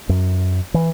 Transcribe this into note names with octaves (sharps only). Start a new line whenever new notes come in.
F#2
E3